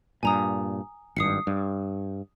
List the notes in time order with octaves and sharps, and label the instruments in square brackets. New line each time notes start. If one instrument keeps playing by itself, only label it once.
[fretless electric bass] G2 A#2 [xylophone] G#5 A#5 D#6
[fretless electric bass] G#1 G2 [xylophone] D#6 C7 C#7
[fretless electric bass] G2